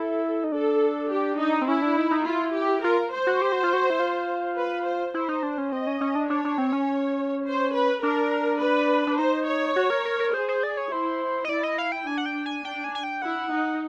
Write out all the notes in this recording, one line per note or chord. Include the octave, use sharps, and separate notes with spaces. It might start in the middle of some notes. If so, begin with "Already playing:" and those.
Already playing: E4 A4
D#4
D4 A4
G4
D#4
C4
C#4 E4
D4
D#4
D#4
E4 F4
G4
F4 A#4
C5
F#4
G4
F#4
F4
F#4
E4
F4
B4
C5
E4 C5
D#4
D4
C#4
C4 D#5
C#4
C#4
D4
D4 C#5
D4
C4
C#4
C5
B4
D4 A#4
B4
D4
D#4 C5
C#5
F#4
A#4
A#4
A#4
G#4 C5
C5
D5
C#5
E4 C5
D#5
E4 D5
D#5
F5
G5
D4 G#5
F#5
G5
G#5
D4 G5
G#5
G#5
G5
E4 F#5
D#4